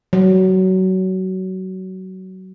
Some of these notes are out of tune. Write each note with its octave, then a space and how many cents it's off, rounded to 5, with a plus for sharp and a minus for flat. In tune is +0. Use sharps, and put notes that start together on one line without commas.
F#3 +20